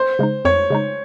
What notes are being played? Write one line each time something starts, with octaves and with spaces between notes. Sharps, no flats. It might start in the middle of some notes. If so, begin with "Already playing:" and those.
Already playing: C5
C#3 G#3 D#4
F2 C#5
C#3 G#3 D#4